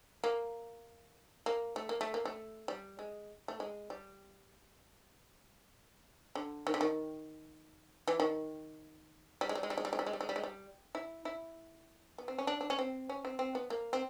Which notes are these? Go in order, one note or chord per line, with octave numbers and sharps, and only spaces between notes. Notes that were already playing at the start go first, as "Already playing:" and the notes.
A#3
A#3
A3
A#3
A3
A#3
A3
G3
G#3
A3
G#3
G3
D3
D#3
D3
D#3
E3
D#3
G3
G#3
G3
G#3
G3
G#3
G3
G#3
G3
G#3
G3
G#3
G3
G#3
G3
E4
E4
B3
C4
C#4
D4
D4
C#4
C4
C#4
C4
C4
B3
A#3
C4